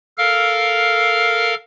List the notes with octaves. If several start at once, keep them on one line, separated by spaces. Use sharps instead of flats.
A4 A#4 F5 F6